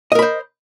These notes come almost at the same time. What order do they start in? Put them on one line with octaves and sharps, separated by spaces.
D#5 A#4 B5 C5